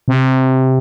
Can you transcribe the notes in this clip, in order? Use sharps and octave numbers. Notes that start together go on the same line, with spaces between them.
C3